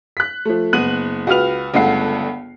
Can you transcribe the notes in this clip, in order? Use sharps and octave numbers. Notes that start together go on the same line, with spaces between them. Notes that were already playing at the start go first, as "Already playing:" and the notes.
F#6 B6
F3 A3
F#1 B3 F#6 D#7 F#7
C#2 F#4 B4 F6 F7
G1 C#2 G2 A3 F#5 C7